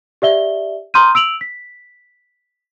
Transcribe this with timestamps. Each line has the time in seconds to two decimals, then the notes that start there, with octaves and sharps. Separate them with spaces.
0.22 G4 D5 E5 G7
0.94 A#5 C6 D#6 F6 G6 D#7
1.15 E6 D7 F7 F#7
1.41 B6